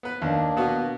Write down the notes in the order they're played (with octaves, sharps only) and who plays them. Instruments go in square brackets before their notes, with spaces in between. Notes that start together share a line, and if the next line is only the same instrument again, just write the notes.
[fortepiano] B3 B4
[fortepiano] D#2 [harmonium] A#3 D4
[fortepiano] B2 B3 F#4